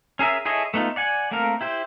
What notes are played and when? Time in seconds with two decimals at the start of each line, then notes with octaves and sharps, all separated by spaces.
0.19 C#4 G#4 A#4 E5
0.45 E4 G#4 A4 C#5 D#5
0.74 A3 B3 D#4 F4
0.96 D5 F#5 G#5
1.31 A3 A#3 C4 A#4 F5
1.61 E4 G4 C5